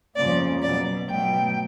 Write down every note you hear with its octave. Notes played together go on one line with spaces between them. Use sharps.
F2 C#3 F3 A#3 D5
B2 F#3 A#3 D5
B2 F#3 A3 G5